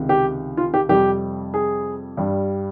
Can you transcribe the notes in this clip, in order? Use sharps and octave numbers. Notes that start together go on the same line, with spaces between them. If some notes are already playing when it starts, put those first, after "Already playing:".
Already playing: C#2 C3 D#3
G4
F4
G4
F2 C3 G3 G4
G#4
G2 G3